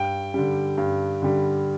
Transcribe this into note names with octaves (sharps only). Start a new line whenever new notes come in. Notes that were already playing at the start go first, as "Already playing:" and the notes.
Already playing: G2 G5
D3 G3
G2
D3 G3